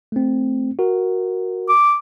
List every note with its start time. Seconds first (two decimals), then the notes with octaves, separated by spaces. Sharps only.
0.12 A3 C4
0.79 F#4 A#4
1.69 D6